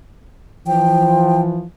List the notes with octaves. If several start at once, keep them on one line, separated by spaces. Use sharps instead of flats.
E3 F3 G5